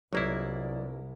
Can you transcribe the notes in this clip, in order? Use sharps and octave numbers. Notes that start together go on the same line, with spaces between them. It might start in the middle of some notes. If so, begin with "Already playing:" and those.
G1 C2 F#3 A#3 E4 D5 D#5